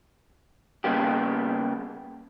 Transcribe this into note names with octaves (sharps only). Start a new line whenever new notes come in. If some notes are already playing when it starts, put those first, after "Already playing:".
C#3 G3 A#3 B3 G4